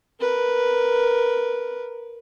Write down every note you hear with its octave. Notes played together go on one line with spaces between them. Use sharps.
A#4 B4